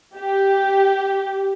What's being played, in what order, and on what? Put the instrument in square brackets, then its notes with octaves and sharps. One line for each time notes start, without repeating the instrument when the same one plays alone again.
[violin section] G4